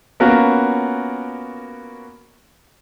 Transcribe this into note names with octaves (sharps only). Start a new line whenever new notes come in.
A#3 B3 C#4 F4 F#4 A#4